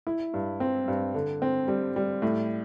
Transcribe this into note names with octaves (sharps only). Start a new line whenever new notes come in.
E4
G2
C4
G2
D3
C4
G3
G3
A2